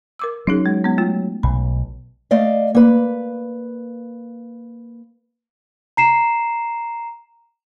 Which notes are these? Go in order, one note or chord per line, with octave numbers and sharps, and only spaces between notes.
A#4 D6 E6
F#3 C#4 D#4 G#4
G#3
G#3 B3
A3 F4
B1 B5
A3 D5 D#5 F5
A#3 B4
A#5 C7 E7